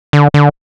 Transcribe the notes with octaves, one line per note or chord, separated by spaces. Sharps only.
D3
D3